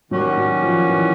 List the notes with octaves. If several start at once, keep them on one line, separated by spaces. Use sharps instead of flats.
D#3 F#3 G3 A#3 C#4 F#4
F#3
F3
E3